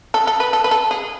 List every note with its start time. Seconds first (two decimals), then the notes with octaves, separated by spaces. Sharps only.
0.14 A4
0.27 A4
0.40 B4
0.53 A4
0.64 B4
0.71 A4
0.91 G#4